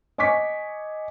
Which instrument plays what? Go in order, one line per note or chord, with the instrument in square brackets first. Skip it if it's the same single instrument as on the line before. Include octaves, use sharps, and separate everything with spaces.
[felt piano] D#5 G#5 C#6 D6 B6